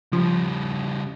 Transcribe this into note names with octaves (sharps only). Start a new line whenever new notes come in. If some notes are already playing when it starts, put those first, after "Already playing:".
C#3 F3 G3